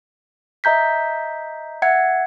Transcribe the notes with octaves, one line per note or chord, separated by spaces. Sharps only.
D#5 E5 A#5 G6 B6
E5 F#5 G#6 C#7